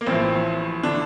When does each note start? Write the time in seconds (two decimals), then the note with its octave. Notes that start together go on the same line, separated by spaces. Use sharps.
0.01 A#3
0.07 A1 A2 F3 C4
0.83 D3 D4